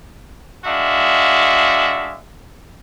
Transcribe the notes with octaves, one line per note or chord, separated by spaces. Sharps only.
G#3 D4 F#4 E5 F5